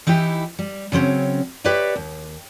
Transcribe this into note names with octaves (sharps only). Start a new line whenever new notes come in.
E3 D#4 E4 G4
G3
C#3 F#3 C4 C#4
G4 B4 C#5 D5 E5
D#2